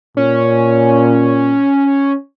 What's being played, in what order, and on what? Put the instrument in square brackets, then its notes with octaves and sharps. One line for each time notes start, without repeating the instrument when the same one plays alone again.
[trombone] A#2 [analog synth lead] C#4